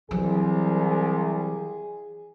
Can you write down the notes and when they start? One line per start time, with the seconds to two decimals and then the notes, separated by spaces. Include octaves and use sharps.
0.11 C2 E3 F#3 G#4